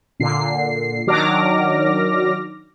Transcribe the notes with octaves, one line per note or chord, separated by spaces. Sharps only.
A#2 D3 C7
D#3 F#3 D4 D6 F6 A#6